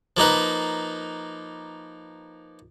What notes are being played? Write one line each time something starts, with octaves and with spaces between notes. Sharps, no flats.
F3 A#3 D#4 B4